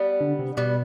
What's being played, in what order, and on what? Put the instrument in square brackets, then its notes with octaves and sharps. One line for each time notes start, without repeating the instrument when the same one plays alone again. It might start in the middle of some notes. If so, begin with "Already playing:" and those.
Already playing: [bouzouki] G3 B3
[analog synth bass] D3
C3
[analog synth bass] B2 [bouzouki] G3 B3